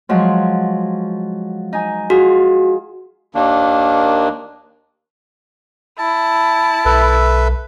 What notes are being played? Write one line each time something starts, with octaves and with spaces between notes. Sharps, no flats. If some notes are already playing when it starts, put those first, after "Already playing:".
F3 F#3 G#3
D#4 G#5
F4 F#4 G#4
D#2 D#3 A#3 D4
E4 A5
B1 A4 B4 E5